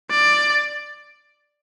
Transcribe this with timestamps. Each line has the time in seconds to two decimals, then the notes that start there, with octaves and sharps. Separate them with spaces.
0.11 D5